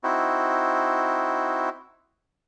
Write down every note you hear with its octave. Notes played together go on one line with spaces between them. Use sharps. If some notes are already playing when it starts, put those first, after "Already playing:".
C4 D#4 E4 F#4